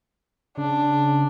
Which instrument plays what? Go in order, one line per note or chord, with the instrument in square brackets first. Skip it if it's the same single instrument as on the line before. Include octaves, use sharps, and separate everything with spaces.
[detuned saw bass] C#3 [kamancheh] D4